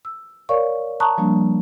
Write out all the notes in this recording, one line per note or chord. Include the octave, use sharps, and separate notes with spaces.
E6
A#4 C#5 D5 F5 C#6
A5 A#5 C#6 D#6 F#6
F3 G3 A#3 D4